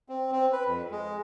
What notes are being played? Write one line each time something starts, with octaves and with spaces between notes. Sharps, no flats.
C4
C4
B4
F2
G#3